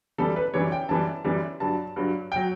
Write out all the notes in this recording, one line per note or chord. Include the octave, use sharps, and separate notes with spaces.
F#2 E3 G3 A4
B4
F#2 E3 G3 C#5
G5
F#2 E3 G3 A5
F#2 E3 G3
G2 F#3 A5
G2 F#3
G5
F#3